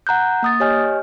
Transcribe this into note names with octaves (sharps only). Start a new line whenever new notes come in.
F#5 A#5 F#6 G6
A#3 D#6 A6
G4 C#5 D#5 G#5 F6 G6